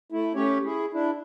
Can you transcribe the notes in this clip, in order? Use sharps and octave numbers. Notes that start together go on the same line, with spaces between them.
A3 E4
A3 C#4 G4 C#5
E4 G#4
D4 E4